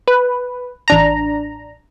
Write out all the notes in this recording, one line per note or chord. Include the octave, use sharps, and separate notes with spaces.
B4
A1 D4 A#5